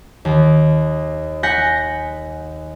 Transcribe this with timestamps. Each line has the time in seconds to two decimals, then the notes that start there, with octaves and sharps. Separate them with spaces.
0.25 D#2
1.43 F#5 G#5 G6 A#6 B6 C#7